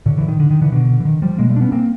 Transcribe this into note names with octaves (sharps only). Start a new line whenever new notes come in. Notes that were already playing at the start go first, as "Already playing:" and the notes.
A2 D3
D3 E3
D#3
D3
D#3
D3 E3
B2 D3
E3
D#3
F3 G3
B2 G#3 A#3
G3 A3
D4
B3 C#4
A#3 C4